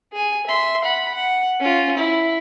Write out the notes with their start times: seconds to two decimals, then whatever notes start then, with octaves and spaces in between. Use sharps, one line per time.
0.12 G#4 G#5
0.47 E5 C6
0.84 F#5 B5
1.14 F#5
1.60 C#4 F4
1.97 E4